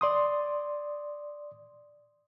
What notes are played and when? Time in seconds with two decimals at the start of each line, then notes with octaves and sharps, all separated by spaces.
0.01 D5 C6 D#6